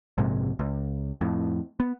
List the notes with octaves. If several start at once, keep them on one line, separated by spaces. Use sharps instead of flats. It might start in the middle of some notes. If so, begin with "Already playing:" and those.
A#1 G#2 C3 G#3
C#2
F2 A2
B3